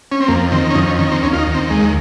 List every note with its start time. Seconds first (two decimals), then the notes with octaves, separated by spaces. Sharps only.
0.12 C#4
0.20 C4
0.28 F2 A#3
0.52 D#3 C4
0.70 C#4
0.75 F2 D#4
0.87 C#4
0.99 D#3 C#4
1.12 C4
1.23 D#2 C#4
1.33 F4
1.39 D#4
1.47 D#3
1.54 C4
1.70 D#2 G#3